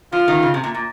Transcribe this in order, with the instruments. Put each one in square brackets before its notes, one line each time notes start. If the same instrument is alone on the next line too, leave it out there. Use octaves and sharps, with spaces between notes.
[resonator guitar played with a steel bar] F3 [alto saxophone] F4
[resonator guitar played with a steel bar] D#3
C#3
C3
A#2
A#2